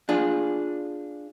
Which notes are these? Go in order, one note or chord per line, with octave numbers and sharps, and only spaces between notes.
D4 F4 G#4